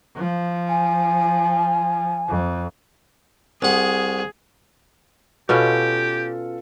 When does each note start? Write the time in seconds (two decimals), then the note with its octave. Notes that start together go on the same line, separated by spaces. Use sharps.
0.17 F3
0.69 G#5
2.29 F2
3.62 C2 G#4 F#5
5.49 B2 B3 C#4 F4 G4 A4 F5